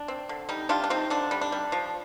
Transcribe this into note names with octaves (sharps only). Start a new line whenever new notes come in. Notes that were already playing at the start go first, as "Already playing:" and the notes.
Already playing: D4
C4
D3
G3 D#4
G3 D4 F4
D4
C4 D#4
D3 D4
G3
D4
G3
F3